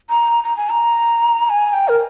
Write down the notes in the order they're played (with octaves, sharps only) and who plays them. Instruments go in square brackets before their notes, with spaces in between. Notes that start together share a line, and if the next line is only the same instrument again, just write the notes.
[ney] A#5
A#5
G#5
A#5
G#5
G5
A#4